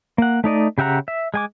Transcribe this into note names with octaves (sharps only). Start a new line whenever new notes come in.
A#3 F#5
A3 D#4 D5 D#5
C#3 G4 E5 F#5 A#5
E5
G#3 G#5 D6